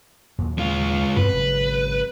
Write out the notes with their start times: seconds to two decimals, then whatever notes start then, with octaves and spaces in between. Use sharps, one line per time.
0.38 D#2 A#2 F#3
0.58 G#3 F4
1.16 G2 B2 C4 B4
1.33 G#1 C#3 F#3